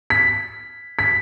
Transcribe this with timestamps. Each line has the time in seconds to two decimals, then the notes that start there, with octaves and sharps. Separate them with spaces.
0.10 B6
0.99 B6